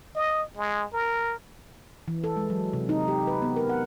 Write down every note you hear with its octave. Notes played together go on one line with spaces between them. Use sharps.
D#5
G#3
A#4
E3
A4
G#3
F#3
C3
D#4
G4
B4
B3
A#4
F#5